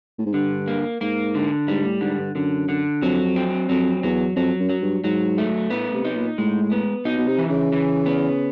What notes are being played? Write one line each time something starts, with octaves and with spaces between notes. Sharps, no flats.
A2
G#2
G2 D3
A#3
G#2 A#3
D3
G#2 G3
A2
G#2 D3
G2
F#2 D3
D3
F2 F#3
C4
F2 F#3
E2 F#3
F2 F#3
F#2
F#3
G2
G#2 F#3
A3
A2 B3
C3
D#4
A#2
A2 G#3
B3
B2 D#4
B2
C3
E3
C#3
E3
B3